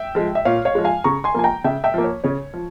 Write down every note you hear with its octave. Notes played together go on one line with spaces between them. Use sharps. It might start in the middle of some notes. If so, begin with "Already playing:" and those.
Already playing: E5 G5
F3 G#3
E5
A#2 C#5 F5
C#5 F5
F3 G#3
F5 G#5
C#3 A#5 C#6
G#5 C6
F3 A#3 G#5
G5 A#5
C#3 E5 G5
E5 G5
F3 A#3
C#5
C#3 C#5
F3